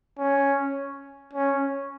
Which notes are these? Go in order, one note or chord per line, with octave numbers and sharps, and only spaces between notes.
C#4
C#4